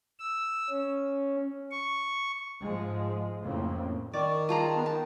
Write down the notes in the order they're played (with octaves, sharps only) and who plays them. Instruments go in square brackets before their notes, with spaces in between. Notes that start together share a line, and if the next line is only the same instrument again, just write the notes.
[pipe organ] E6
C#4
C#6
[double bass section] G#2 F3 G#3
F2 A2 C#3 F3 A#3 C4
[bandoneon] D#3 [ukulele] D5 [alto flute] C#6
[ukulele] F4 G#4 A#5 [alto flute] A5
[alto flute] B3
[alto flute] G5 [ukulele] A5